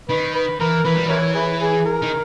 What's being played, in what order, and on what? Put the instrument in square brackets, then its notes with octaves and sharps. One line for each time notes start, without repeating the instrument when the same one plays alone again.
[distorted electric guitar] D#3 [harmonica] B4
[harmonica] B4
[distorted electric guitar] E3 [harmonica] A#4
[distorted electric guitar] E3 [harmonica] B4
[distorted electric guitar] G3
[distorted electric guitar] E3 [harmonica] E4 A#4 C#5
[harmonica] E4 G#4 B4
G#4
A#4
[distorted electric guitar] D#3